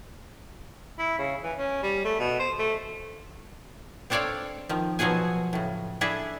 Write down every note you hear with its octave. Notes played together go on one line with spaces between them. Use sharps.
E4
C#3
E3
C#4
G3
A3
B2
C5
A3
C4 D4 A4 C#5 D5 F5
D#3 F3
B2 F3 F#3 F#4 G#4 G#5
A2 C#3
D4 E4 G#4 A4 E5